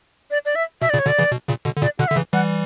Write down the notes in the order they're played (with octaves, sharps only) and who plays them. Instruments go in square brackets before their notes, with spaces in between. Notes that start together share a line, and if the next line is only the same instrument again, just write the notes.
[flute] D5
D5
E5
[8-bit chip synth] B2 [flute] E5
[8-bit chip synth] A#2 C#3 [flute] D5
[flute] C#5
[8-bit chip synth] B2 D3 [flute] D5
[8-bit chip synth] C#3 E3
B2
A#2 C#3
B2 D3
D3
[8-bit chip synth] A#2 C#3 [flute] D5
[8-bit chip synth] B2 D3 [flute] F#5
[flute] E5
[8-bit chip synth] D3
C#3 E3
[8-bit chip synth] E3 G3 [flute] F#5